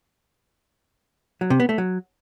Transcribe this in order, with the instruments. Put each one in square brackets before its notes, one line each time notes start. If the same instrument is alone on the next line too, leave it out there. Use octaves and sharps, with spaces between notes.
[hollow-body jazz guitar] F#3
C3
B3
A3
F#3